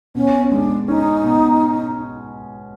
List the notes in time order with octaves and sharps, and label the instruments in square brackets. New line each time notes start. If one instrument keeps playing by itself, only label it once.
[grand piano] B2 [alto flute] C#4
[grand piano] G#3 [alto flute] D4
[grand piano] C#4 [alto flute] D#4
[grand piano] B2